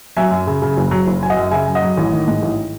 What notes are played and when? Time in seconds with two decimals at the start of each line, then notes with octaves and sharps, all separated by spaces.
0.17 F#3 E5 G#5
0.31 F#2
0.47 C#3
0.62 C#3
0.77 F#1
0.91 F#3
1.07 F#1
1.22 F#3 G#5
1.30 D#5 F#5
1.36 F#2
1.51 C#3 E5 G#5
1.68 F#2
1.75 D#5 F#5
1.82 F#3
1.97 A1
2.12 D#3
2.28 G#2
2.42 A1